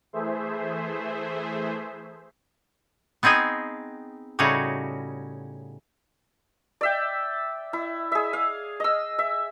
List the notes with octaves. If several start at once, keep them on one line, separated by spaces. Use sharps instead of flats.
E3 A3 G#4 C5 E5
B3 C4 D#4 G#4 D#5
A2 C#3 G3 D#4 F#4
D5 E5 G5
E4
G#4 E5
F5
D#5 E6
E5